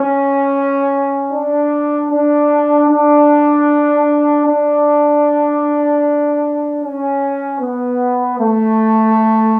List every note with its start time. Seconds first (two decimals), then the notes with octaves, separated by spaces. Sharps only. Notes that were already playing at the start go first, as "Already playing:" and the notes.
Already playing: C#4
1.32 D4
2.11 D4
2.88 D4
4.46 D4
6.82 C#4
7.59 B3
8.38 A3